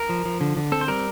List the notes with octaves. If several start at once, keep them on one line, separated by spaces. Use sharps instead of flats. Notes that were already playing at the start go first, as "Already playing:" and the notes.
Already playing: A#4
F3
F3
D3
D3
C4 A4
C5
G3 A#4